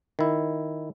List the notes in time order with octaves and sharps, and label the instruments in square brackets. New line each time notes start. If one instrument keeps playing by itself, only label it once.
[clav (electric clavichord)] D#3 E4